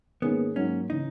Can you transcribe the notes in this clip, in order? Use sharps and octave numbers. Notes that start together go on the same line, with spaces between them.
G#2 D#3 A#3 B3 C#4 G#4
G#2 F#3 A#3 C#4
C#3 E3 D#4